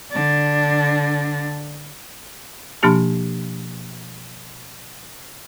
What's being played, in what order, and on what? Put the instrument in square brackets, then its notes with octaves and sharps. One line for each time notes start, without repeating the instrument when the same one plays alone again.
[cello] D3 D4
[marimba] B2 F3 A#3 D4 G4 A5